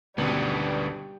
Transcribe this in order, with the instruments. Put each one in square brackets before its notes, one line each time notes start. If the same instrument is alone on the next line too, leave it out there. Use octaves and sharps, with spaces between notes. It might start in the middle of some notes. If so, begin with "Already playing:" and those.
[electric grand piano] G#1 B2 [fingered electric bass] D2 D3 C#4 [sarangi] G3 [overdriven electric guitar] B3 D4